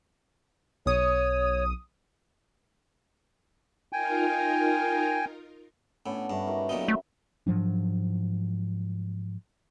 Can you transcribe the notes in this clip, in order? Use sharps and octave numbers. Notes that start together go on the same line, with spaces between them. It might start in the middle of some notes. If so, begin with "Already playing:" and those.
B1 C#5 D#6
D#4 F4 A#4 G5 G#5
A2 B3 C#4 D4
G2 A3 B4
F#3 D#4 G4 A#4
B1 A#2 D#4 E5
A3
G#2 F3 F#3 D4